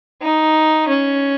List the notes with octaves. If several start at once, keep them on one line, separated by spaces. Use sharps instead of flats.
D#4
C#4